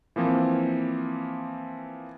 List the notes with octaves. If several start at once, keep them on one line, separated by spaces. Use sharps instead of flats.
E3 F3 A#3 C4